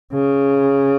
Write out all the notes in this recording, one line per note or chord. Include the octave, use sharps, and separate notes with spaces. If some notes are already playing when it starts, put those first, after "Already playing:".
C#3